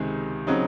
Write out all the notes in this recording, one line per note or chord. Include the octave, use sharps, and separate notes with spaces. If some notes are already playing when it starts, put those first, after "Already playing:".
Already playing: C#2 C3 D#3 G#3
C#3 F#3 C4 D#4